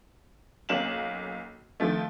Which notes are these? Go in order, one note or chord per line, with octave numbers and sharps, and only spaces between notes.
B1 A#3 C#4 E7 F#7
D#3 F3 A3